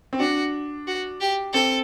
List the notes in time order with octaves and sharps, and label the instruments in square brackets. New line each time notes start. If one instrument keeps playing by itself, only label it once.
[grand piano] C4
[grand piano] D4 [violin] F#4
[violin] F#4
G4
[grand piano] C4 [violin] A4